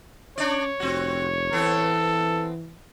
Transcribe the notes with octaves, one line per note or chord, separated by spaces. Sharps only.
C#4 D4 C#5 D5
F1 C4 F#4
E3 B3 C4 A4